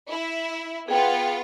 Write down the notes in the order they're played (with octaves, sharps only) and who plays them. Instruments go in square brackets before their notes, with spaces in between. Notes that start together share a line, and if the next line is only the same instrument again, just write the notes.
[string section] E4
[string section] B3 F4 [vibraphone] G#4 G5